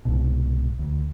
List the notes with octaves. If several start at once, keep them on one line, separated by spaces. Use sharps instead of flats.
C2 G#2 B2
D2